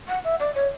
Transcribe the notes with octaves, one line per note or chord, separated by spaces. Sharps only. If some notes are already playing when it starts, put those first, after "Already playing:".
F#5
E5
D5
C#5